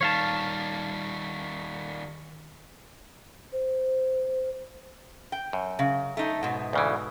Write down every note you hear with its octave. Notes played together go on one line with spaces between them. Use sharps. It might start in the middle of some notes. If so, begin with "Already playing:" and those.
D#3 G3 C#5 F5 A5
C5
G5
F#2
C#3
A3 D#4
G#2 B2
D2 C#3 E3